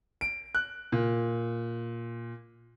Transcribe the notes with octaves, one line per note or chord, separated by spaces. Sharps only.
D7
F#6
A#2